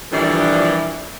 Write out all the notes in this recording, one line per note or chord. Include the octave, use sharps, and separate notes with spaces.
A#2 D3 E3 F3 G3 D4